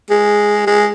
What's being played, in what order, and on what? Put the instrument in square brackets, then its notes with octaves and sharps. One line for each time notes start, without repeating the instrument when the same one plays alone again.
[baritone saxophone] G#3
G#3